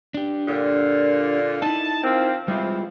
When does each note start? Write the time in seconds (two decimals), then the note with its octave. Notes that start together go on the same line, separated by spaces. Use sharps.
0.14 D4 G4
0.48 A#2 D3
1.62 D#4 E4 A5
2.04 F3 A#3 C4
2.48 E3 F3 G3 G#3 C4 F4